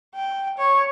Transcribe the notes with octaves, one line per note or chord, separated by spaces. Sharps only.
G5
C#5